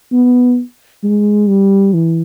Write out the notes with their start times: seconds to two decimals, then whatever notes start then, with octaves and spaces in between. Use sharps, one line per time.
0.12 B3
1.03 G#3
1.48 G3
1.94 E3